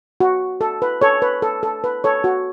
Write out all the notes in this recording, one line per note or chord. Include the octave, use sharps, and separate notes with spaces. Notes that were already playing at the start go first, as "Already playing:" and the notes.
F#4
A4
B4
A4 C#5
B4
A4
A4
B4
A4 C#5
F#4